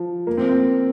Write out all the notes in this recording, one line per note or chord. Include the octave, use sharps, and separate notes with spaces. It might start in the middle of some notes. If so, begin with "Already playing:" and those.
Already playing: F3
A#3
C4
C4